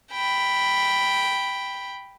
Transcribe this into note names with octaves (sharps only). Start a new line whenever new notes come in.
G5 B5